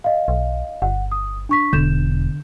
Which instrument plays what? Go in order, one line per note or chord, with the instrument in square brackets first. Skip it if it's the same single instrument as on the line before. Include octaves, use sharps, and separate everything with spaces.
[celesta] D#5 F5
[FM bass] B1
[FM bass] G1 [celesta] F#5
[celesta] D#6
D4 C#6 B6
[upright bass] E1 [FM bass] D3 [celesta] G6 E7